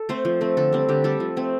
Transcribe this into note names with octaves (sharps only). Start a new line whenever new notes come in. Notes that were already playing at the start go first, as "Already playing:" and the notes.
Already playing: A4
A3 C4 C5
F3
A3 C4
D3 A4
G3 C4
D3 G4
G3 C4 A4
F3
A3 C4